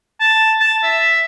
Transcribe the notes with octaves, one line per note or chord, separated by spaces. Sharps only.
A5
A5
E5